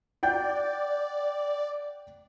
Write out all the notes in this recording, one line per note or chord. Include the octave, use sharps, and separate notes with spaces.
D5 F#5 G5 G6